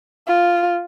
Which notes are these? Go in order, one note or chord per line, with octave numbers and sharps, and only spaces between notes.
F4